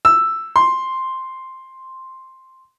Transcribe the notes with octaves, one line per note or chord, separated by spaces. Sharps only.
E6
C6